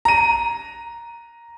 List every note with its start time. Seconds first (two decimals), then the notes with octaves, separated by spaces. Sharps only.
0.05 A#5 D#7